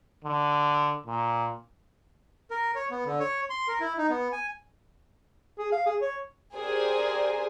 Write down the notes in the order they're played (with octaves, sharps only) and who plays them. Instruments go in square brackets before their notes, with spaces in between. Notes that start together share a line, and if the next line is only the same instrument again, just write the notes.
[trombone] D3
A#2
[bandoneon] A#4
C#5
B3
D3
C#5
C6
A#4
E4
D#4
B3
G#5
[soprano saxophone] G#4
F5
G#4
C#5
[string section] G4 G#4 A#4 C5 D5 G#5